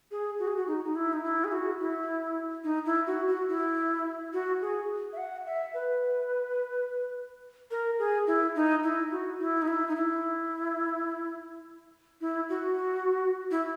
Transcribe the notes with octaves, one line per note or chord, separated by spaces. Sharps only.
G#4
F#4
G#4
F#4
D#4
D#4
E4
D#4
E4
G#4
F#4
E4
D#4
E4
F#4
F#4
E4
F#4
G#4
E5
F#5
E5
B4
A#4
G#4
E4
D#4
E4
F#4
E4
D#4
E4
D#4
E4
E4
F#4
E4